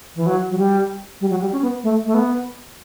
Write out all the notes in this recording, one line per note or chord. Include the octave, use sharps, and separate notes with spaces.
E3
F#3
F#3
G3
G3
F#3
G3
C#4
B3
A3
A3
B3